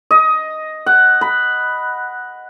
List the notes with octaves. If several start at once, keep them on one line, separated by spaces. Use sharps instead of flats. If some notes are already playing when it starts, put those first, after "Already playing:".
D#5
F#5
B5